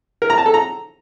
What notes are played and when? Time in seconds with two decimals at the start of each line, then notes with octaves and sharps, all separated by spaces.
0.22 A#4
0.30 A#5
0.38 A5
0.46 A4
0.54 A#5